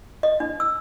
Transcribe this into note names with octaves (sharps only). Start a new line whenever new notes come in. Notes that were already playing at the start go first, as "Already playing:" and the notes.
D#5
D4
E6